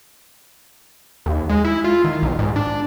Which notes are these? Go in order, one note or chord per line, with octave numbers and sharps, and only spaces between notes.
D#2
G#3
E4
F4
D#3
B1
G#2
D4